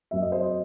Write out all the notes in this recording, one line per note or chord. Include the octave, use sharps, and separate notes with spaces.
F#2 F#3 C4 E5
D#5
C5
D#5